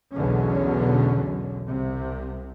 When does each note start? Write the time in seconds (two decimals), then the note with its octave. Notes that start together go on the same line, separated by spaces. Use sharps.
0.13 B1 E2 B2 D3 F#3 C#4
1.65 C2 C3